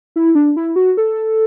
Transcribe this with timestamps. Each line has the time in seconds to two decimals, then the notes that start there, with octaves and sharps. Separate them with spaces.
0.16 E4
0.35 D4
0.57 E4
0.76 F#4
0.97 A4